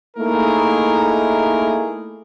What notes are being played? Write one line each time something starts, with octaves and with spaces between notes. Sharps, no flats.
A3 A#3 D#4 E4 G#4 A#4